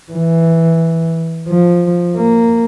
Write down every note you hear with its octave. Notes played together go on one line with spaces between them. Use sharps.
E3
F3
A#3